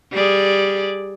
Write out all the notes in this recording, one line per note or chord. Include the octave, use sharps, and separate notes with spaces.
G3 G#4 D5